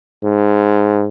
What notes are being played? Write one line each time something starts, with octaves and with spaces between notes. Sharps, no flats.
G#2